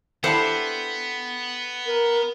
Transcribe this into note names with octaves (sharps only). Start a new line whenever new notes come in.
B3 D4 E4 G4 A4 C5 F#5
A#4